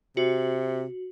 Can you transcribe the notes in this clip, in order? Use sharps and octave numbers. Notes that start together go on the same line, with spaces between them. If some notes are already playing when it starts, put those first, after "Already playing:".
C3 F#4